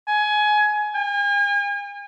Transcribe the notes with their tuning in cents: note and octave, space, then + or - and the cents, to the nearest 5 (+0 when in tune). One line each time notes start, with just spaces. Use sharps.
G#5 +20
G#5 -40